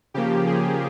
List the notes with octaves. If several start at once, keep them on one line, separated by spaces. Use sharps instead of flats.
C#3 F3 A#3 G4
G#4